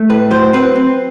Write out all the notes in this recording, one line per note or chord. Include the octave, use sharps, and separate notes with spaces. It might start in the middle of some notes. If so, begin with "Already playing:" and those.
Already playing: A3
A2 B4
F#3 C5
C4 B4
C4